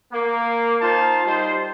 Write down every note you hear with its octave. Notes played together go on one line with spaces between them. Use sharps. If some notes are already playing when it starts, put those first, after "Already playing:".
A#3
D#4 F4 C5 F5 A5
G3 D#4 C5